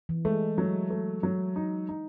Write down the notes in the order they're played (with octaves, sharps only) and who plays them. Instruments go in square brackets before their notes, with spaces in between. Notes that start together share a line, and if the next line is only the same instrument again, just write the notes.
[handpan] E3
[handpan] G#3 [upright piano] A3
[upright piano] F#3
A3
F#3
D#4
D#4